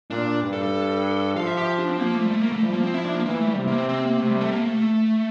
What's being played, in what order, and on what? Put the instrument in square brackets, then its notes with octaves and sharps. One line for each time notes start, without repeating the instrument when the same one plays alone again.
[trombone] A#2 [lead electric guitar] D4
[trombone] G2
[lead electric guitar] A4
A4
[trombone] F3 [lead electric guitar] F5
[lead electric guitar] E5
G4
D4
C4
[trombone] F3 [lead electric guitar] A#3
[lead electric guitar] A3
G3
A3
A#3
A3
[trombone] F3 [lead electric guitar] G3
[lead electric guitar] A#3
C4
E4
D4
A#3
[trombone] E3 [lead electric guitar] A#3
[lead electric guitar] A3
G3
[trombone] C3
[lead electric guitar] A#3
C4
C4
A#3
[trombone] C3 [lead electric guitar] A3
[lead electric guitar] G3
A3
A#3
A3